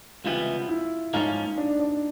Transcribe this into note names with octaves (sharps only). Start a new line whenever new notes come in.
C#2 C3 E3 G3 B3 F4
E4
G#2 F3 A#3 C#4 D#4 F4
D4
D4